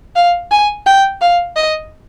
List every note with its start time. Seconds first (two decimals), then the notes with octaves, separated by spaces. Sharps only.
0.16 F5
0.51 G#5
0.86 G5
1.21 F5
1.56 D#5